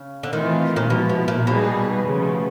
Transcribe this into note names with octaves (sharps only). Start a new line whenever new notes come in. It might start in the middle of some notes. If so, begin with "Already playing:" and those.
Already playing: C#3
D3
D#3 E3 A3 C4 F4
A#2
B2 F3 G#3 B3 E4
B2
A#2
B2 G3 A#3 D#4 G#4 B4
C#3 F3 A3